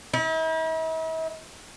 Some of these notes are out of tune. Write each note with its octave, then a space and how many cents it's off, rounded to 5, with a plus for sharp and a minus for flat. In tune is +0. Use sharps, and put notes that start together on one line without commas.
E4 -45